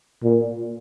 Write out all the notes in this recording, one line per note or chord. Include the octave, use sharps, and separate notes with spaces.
A#2